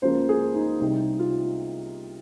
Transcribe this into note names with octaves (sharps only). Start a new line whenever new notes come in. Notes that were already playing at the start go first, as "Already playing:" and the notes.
C#2 C#3 F3 A#3 C5
G#4
D#4
C2 C3 G3 D#4
F4